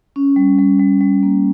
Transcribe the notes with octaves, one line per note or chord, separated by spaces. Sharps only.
C#4
G3
G3
G3
G3
A#3